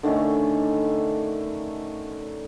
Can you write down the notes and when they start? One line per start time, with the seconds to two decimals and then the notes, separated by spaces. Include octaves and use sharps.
0.03 D3 D#3 A3 C#4